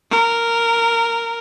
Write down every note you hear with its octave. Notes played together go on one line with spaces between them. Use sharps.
A#4